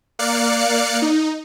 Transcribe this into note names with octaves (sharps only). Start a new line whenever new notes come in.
A#3 D5 F5 F#6 C#7
D#4